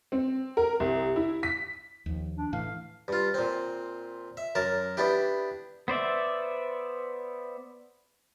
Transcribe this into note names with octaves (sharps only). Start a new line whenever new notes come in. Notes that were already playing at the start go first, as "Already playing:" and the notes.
C4
A#4
C2
E4
B6
D#2 F3
D4
A2 E3 F5
G2 F4
A#2 C4
E5
F#2 A#4 A5
B3 D4 E4 G4
B3 C5 D5 E5